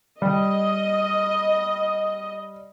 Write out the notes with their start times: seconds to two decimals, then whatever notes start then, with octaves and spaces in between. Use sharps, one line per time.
0.22 G3 D#5